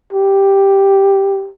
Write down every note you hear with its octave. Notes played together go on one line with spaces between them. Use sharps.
G4